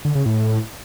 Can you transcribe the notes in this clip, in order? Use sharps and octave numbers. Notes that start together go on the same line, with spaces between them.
D3
C#3
A2